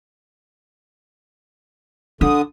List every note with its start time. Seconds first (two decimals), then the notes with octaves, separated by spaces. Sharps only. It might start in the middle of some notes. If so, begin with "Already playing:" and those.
2.21 D3 D4 D#6